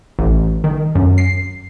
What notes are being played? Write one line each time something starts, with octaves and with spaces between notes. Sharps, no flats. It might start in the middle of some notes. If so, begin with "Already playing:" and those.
A1
D#3
F#2
C7